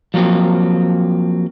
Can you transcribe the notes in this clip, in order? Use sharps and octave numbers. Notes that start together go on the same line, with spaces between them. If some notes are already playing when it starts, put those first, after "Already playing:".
F3 F#3 A#3 C4